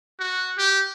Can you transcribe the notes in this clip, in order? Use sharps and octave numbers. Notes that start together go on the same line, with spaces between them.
F#4
G4